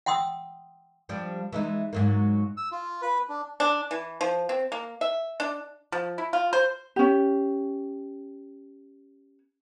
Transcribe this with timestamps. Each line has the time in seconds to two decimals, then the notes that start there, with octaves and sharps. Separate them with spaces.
0.06 F#5 G5 C6 D#6 E6
1.09 F3 G3 D4
1.53 E3 G#3 D#4
1.93 G#2 F#3 A#3
2.57 E6
2.72 F4
3.02 B4
3.29 D4
3.60 D4
3.91 E3
4.21 F3
4.49 C4
4.72 A#3
5.01 E5
5.40 D4
5.92 F3
6.18 E4
6.33 F4
6.53 C5
6.96 C#4 G4